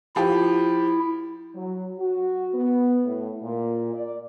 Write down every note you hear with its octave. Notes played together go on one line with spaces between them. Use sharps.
F3 E4 G4
F#3
F#4
B3
A2
A#2
D5